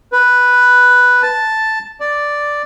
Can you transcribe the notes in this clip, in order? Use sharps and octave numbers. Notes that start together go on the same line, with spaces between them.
B4
A5
D5